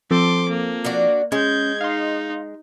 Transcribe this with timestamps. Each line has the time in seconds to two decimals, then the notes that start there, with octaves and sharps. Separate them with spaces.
0.11 F3 C4 A4 C6 D6
0.49 A#3
0.85 D4 F#4 D5
1.32 G#3 C#4 G6 G#6
1.81 D#4 F5 C6